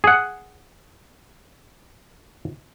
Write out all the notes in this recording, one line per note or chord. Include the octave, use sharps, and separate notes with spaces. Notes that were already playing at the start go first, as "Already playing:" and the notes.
G#4 F#5